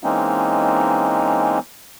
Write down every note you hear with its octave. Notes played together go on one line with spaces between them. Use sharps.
E3 G#3 A#3 C4 C#4 D#4